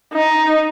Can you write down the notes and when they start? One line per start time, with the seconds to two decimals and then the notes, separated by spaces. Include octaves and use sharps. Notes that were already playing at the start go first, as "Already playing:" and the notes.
0.13 D#4